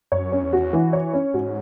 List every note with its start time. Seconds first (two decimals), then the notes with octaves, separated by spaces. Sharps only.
0.12 F#2 C#5
0.32 C#4
0.43 E2
0.53 F#4
0.73 E3
0.93 C#5
1.13 C#4
1.34 G#2 F#4